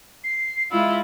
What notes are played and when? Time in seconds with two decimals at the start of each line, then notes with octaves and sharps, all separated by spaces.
0.24 C7
0.71 G#3 E4 F4 E6